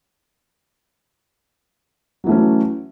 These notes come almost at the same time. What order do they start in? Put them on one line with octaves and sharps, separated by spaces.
F#3 E3 A3 C#4